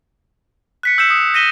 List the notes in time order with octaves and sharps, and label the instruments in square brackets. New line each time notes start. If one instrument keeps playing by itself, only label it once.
[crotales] F#6 B6 C#7
E6 G6 B6 C#7 E7
D#6
D#6 A#6 B6 D#7 E7 G7